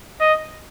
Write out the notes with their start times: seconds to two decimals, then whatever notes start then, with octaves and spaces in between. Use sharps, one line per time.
0.21 D#5